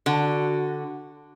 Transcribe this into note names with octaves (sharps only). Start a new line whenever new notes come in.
D3 F#4